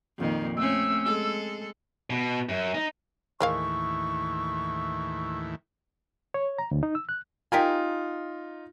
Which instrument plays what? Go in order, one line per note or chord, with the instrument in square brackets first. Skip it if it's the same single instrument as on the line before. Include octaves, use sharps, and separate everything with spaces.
[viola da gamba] F2 A#2 D#3
[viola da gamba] A3 C4 C#4 [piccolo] E6
[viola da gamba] G#3 A4
[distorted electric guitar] B2
F#2
D#4
[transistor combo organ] D#2 A2 E3 [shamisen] G#3 A#4 F5 [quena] C#6
[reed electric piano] C#5
A#5
D2
D#4
E6
F#6
[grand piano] D#4 F4 [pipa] G4 A#4 G#5